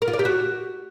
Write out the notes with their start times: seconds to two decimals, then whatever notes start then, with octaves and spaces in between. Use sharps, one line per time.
0.02 A#4
0.08 F4
0.13 D5
0.19 G4
0.25 F#4